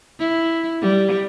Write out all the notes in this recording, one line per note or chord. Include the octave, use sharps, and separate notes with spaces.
E4
G3